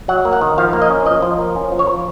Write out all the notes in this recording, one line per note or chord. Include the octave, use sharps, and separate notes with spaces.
F#3 F#5
A#3
F#5
D#3
F3 F5
A#3
D#5
C#4
F3 D#5
F3
A#3
C#4
F3
C#5
F3